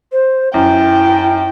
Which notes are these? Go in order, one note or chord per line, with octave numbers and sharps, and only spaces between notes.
C5
F#2 E4 G5